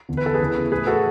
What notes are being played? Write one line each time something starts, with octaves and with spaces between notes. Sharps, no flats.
E2 D3
B4
A4
G#4 B4
E2 C#3 E3
A2 E3 G#4 B4
F#4 A4